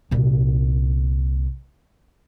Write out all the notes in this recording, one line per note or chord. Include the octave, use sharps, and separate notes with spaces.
C2 A#2